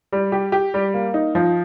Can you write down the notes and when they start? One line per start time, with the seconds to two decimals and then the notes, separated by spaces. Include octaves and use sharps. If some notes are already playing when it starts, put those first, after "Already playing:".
0.12 G3
0.32 G4
0.52 G4
0.74 G3
0.94 A#3
1.14 D#4
1.35 F3